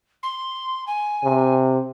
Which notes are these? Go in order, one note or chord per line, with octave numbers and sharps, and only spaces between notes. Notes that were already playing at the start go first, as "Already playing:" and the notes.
C6
G#5
C3